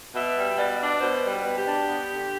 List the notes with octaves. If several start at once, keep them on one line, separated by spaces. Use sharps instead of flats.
B2 E5
G3
B2 D5
D4
B2 C5
G3
B4
B2
G4
D4
B3
D3